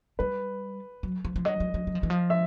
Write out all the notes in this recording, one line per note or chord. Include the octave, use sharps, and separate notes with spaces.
G3 B4
F#3
F3
F3
F#3 D#5
F#3
F#3
F#3
F3
E3
F3
E5